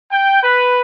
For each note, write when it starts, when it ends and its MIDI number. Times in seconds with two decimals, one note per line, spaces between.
0.11 0.39 79
0.42 0.81 71